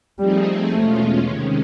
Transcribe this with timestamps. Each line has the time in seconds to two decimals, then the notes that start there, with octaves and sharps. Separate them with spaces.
0.19 F3 G3 A3 C4 D#4 G#4
0.71 E2 B2 G#3 A3 C#4 F4
1.23 C3 D#3 G#3 C#4